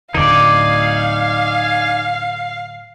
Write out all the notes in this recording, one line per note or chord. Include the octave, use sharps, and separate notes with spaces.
D1 D2 D3 D#4 D5 F5 G#5